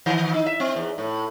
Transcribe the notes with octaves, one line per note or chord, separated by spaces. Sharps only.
D#3
D#4
E5
C4
E2
A2